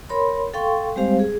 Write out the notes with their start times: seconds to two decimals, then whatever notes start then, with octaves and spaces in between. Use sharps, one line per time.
0.09 A#4 C#5 B5 C6
0.54 A4 F5 G5 C6 C#6
0.96 G3 G#3 C4 G4 C5 F5
1.19 G#4